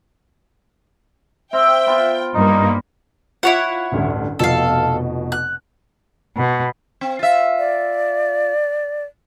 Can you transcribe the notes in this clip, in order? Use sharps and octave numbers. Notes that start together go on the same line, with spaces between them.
C4 E5 F5 G5
B3 F4
G2 A#3 D#4
E4 F4 C#5 F#5
A1 D2 G2
F1 B2 F3 A4 F5
F#6
B2
C4
F4 E5
D5